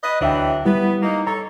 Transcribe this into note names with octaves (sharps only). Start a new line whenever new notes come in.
B4 D#5
D2 E3 F#3 D4 E5 G5
G3 B3 E4
A#3 D#4
A4 C#5 A#5